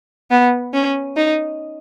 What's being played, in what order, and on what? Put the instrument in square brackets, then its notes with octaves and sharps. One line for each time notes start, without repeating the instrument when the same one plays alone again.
[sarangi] B3
C#4
D#4